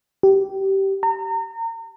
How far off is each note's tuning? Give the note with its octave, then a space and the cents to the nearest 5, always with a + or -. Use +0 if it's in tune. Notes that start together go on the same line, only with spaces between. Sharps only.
G4 -20
A#5 -35